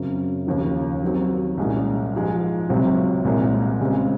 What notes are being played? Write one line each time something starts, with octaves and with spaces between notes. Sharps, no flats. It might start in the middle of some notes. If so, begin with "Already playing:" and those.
Already playing: F#2 C#3 F#3 C4
D#2 C#3 F3
D#3 F#3 C4 F#4
C2 A#2 G#3 C#4
G#2 F3 G#3
C#2 C3 F#3 C4 F4
C2 A#2 G#3 C4
C#3 G#3 C4